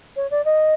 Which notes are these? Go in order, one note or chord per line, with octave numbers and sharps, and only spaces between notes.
C#5
D5
D#5